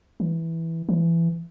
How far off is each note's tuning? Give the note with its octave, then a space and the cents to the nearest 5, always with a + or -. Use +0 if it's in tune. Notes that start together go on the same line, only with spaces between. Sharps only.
E3 -5
E3 +20